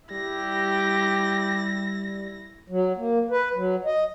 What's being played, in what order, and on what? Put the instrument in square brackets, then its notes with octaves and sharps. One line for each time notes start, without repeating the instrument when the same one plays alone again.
[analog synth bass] G3 [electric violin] E4 A#6 [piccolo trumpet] G4
[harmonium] F#3
A#3
B4
F#3
D#5